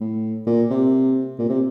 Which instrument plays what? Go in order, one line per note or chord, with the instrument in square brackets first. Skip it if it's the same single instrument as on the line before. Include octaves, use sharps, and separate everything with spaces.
[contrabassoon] A2
A#2
C3
A#2
C3